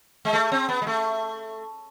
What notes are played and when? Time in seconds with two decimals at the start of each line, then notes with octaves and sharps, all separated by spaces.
0.25 G#3
0.33 A3
0.52 C4
0.69 B3
0.82 G#3
0.87 A3